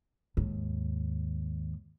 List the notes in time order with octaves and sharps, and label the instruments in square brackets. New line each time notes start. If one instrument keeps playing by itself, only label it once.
[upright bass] D#2 G#2